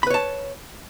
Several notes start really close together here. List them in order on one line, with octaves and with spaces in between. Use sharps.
B5 B4 C#5 A5